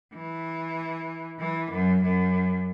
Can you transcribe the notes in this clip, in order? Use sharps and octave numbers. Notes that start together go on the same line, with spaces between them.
E3
E3
F#2
F#2